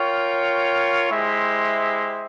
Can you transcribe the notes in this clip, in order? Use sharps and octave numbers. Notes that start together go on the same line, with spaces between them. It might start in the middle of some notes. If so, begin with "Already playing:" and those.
Already playing: F4 A#4 C#5 G5
G#3 E4 G4 C5 E5